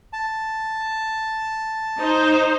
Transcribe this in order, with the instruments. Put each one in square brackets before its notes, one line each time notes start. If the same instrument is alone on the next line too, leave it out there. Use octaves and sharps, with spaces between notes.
[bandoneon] A5
[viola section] D#4 C5